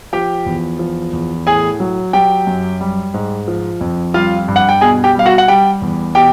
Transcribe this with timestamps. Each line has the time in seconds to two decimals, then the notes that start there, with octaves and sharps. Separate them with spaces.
0.13 F3 G4 G5
0.46 E2
0.79 F3
1.13 E2
1.47 A2 G#4 G#5
1.80 F#3
2.13 F#3 G4 G5
2.47 F#2
2.81 G3
3.14 G#2
3.48 F3
3.81 F2
4.14 G3 F4 F5
4.48 G2
4.56 F#5
4.69 G5
4.81 B2 G#4 G#5
5.04 G4 G5
5.15 G3 F5
5.26 F#4 F#5
5.38 F#5
5.48 G3 G4 G5
5.82 E2
6.15 B2 G4 G5